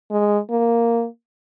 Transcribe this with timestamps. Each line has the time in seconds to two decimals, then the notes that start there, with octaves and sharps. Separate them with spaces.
0.11 G#3
0.50 A#3